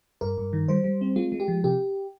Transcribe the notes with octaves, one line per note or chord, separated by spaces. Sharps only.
G2 A#4
G2
D#3
G3 C5
G3
C4
G#3 F4
G#3
G4
F3
C3 G4